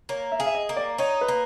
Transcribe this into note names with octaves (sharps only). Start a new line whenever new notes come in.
A#3 C#5
E5
G#4 F5
E5
D#5
A#3
D5
D#4 C#5
B4
A#3